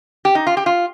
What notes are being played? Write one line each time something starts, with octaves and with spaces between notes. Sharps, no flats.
G4
D#4
F4
G4
F4